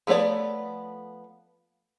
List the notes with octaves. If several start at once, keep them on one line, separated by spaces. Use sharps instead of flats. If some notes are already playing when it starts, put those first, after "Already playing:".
F3 A3 B3 C#5 D5